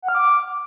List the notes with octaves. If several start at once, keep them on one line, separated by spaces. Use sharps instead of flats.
F#5
F6
D6